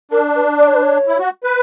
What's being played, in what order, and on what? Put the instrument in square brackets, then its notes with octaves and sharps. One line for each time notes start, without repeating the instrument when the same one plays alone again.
[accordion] D4 [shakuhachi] A#4
[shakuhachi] B4
D5
C#5
B4
C#5
[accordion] E4
F#4
B4